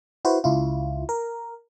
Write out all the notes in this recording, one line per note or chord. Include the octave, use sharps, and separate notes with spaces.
E4 F#4 B4 C5
C#2 E4 F4
A#4